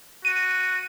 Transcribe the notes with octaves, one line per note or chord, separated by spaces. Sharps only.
F#4 D#7